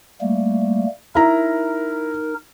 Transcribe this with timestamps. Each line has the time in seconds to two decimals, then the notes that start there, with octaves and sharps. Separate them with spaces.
0.21 G3 A3 A#3
1.15 D#4 E4 A#4 A#5